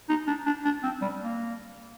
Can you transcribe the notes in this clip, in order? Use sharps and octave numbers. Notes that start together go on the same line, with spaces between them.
D#4
D4
D4
D4
C4
G3
A#3